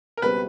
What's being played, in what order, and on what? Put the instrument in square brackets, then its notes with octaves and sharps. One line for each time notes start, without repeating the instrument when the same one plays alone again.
[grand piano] A#4
[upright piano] C#2 B2 G3 C4 [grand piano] B4